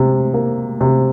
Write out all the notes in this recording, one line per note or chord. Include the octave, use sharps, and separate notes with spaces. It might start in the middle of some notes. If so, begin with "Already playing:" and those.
Already playing: C3
A#3
C3